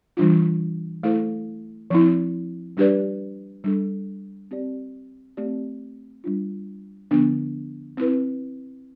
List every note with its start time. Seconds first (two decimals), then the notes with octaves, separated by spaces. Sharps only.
0.17 E3 G3 D4 F4
1.03 A3 E4 A4 C5
1.90 F3 C4 E4
2.77 G3 D4 G4 B4 D5
3.64 G3 D4 A4
4.51 C4 G4 D5
5.37 A3 C4 G4 D5
6.24 G3 D4 F4
7.11 D3 F3 B3 D4
7.97 C4 E4 B4